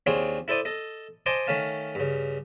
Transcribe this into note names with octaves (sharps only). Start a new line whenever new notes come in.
D#2 C4 D4 F4 G#4 C#5
E4 A4 C5 D5 D#6
A4 D#5
C5 D#5 G#5 A5 C6 D6
D#3 A3 C#4 F5 A5
G2 C#3